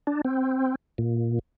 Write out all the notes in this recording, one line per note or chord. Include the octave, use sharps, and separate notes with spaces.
D4
C4
A#2